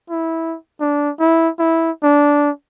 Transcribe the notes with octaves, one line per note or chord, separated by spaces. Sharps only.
E4
D4
E4
E4
D4